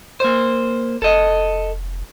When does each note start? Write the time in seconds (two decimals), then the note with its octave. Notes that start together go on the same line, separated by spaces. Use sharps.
0.20 A#3 C5
1.02 F1 A4 D#5